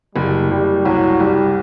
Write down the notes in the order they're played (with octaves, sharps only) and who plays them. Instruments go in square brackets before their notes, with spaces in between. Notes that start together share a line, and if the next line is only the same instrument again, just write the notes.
[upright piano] F#1 [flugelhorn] G3
[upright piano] F#1 [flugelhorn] G3
[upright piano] C2 [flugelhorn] F#3
[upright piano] C2 [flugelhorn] G3